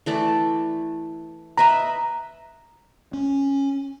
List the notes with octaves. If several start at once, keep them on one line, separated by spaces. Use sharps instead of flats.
E3 A3 D5
B4 D#5 E5 A#5
C#4